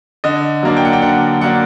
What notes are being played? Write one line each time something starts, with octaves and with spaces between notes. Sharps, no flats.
D3 D#5
F#3 A#3 D4
G5
F#5
G5
D3 F#5
F#3 A#3 D4 F#5